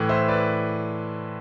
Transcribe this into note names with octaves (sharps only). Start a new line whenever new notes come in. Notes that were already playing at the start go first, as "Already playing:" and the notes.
Already playing: A2 E3
C5 E5
B4 D5